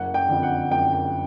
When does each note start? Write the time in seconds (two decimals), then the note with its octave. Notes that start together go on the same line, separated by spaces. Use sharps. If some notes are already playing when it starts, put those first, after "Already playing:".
Already playing: F#1 F#5
0.14 G5
0.29 F2 D3
0.43 F#5
0.71 F#1 G5
0.93 G5